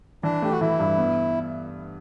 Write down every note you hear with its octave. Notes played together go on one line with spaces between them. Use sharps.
E3 D4
A3 G4
F#4
E3 E4
G2
B3